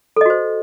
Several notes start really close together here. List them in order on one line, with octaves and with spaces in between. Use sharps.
A4 D#5 F#4 C5